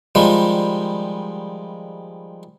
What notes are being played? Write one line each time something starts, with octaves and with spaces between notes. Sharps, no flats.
D#3 F3 G3 G#3